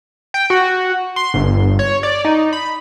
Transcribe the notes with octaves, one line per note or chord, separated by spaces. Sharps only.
G5
F#4
C6
G1
C#5
D5
D#4
B5